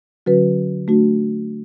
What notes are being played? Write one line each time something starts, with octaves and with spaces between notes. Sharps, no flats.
D3 F#3 C#4 F#4 B4
A3 D4 F#4